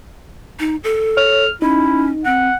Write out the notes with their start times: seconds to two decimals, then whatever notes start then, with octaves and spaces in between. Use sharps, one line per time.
0.60 D#4
0.84 A4
1.17 C#5 F6
1.62 C#4 D#4 E4
2.25 C4 F#5